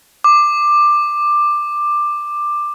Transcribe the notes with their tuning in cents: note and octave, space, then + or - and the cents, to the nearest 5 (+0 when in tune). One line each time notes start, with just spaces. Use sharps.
D6 +15